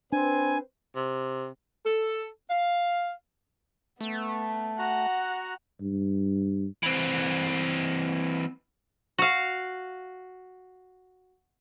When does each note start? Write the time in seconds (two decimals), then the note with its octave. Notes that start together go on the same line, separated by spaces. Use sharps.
0.12 C4 D4 B4 C5 G#5
0.96 C3
1.86 A4
2.50 F5
4.01 A3 B3
4.79 F#4 F#5 A#5
5.81 G2
6.83 E3 C4
9.18 F#4 F5